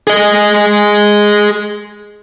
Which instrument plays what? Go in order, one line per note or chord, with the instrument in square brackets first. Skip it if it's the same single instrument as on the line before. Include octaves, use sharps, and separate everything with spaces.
[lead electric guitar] G#4 D#5